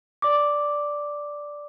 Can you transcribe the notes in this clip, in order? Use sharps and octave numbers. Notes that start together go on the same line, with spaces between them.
D5 D6